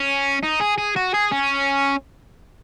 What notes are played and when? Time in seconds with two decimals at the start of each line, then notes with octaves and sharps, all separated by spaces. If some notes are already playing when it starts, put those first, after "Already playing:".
Already playing: C#4
0.43 D#4
0.60 G#4
0.78 G#4
0.96 F#4
1.14 G#4
1.31 C#4